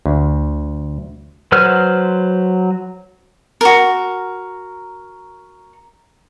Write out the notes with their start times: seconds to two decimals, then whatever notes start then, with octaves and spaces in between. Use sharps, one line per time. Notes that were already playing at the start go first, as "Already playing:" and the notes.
0.06 D2
1.52 F#3 B4 C5 F6
3.61 F#4 A#4